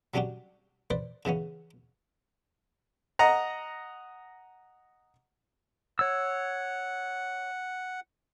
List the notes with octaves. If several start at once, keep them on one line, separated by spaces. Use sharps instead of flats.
F#3 G3 C#4 D4 F#4 G4
B4 C5 D5
C#3 E3 B3 C#4
D#5 F#5 A#5
C#5 F#5 E6